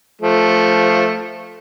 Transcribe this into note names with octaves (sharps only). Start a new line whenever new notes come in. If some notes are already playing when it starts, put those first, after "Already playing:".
F3 A3